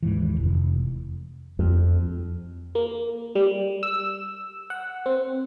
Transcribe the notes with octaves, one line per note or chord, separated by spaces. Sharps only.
D#2 G#2 E3
F1
F2
A#3
G3
E6
F#5
C4